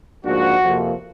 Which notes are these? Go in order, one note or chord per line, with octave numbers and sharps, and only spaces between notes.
G#2 F3 A#3 D4 F#4
F2 C3 F3 A#3